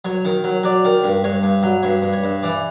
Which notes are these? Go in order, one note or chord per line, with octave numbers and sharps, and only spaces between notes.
F#3 C#5
D#3
F#3
F#3 D5
D#3
G2
G2 C#5
G2
F#3
G2 C#5
G2
C#5
G2
E3 D5